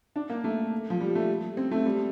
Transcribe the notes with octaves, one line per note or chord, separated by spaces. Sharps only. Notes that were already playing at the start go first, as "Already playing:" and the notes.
D4
A#3
A3
F3
G3
A3
C4
A3
G3